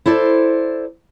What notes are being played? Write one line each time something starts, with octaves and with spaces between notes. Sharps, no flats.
E4 A4 C5 D5